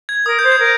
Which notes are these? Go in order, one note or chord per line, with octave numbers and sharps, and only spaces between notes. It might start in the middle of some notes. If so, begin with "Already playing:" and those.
G#6
A#4 D#6
G6
C5
G#6
A#4